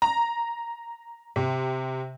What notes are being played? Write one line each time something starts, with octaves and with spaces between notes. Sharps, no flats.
A#5
C3